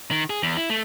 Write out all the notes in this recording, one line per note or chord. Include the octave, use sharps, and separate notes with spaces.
D#3
G#4
E2
E4
A3